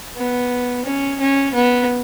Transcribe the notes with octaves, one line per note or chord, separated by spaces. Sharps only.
B3
C#4
C#4
B3